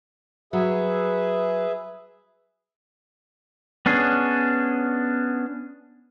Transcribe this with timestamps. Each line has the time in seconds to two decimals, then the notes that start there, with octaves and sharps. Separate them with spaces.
0.53 F#3 G#4 B4 E5
3.86 B3 C#4 D4 G#4